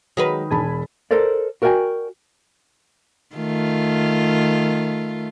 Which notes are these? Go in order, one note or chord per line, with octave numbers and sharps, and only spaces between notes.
D#3 F#3 G#3 A#4 B4
E1 G#5 A5 B5
A4 A#4 C5 D5
F#4 A#4 D5 F5 G5 G#5
D#3 A3 F4